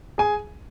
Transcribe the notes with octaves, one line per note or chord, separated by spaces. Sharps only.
G#4 G#5